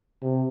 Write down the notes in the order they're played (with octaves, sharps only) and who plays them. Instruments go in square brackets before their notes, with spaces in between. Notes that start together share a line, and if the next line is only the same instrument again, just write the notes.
[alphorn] C3